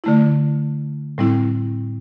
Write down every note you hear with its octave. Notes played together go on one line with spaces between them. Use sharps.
D3 A3 E4
A2 G3 C4 E4